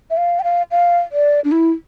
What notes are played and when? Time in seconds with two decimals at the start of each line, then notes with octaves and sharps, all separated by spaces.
0.10 E5
0.17 F5
0.39 G5
0.44 F5
0.71 F5
1.12 D5
1.44 D4
1.52 E4